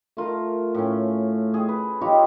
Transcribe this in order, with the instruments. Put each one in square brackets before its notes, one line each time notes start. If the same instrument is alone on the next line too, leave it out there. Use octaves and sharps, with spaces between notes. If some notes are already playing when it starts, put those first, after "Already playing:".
[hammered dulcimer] A3 F4 A#4
A2 C#4
G#4
B4
D#4 F4 G4 C#5